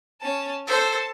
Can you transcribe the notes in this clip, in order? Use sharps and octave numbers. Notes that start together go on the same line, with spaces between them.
C#4 A5
A4 C5 A5